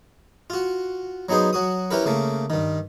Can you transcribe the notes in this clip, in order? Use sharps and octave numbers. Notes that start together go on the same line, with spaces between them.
F4 F#4
F#3 B3 D#4 G#4 C5
F#3 F#4 D#6
C#4 E4 G4 A#4 B4
C#3 A3 A#3
G2 D#3